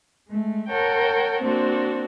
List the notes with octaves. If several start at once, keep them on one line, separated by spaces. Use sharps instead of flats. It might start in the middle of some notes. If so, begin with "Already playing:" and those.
G#3 A3
A#4 C#5 F#5 G5 A5
A#3 C4 D4 F#4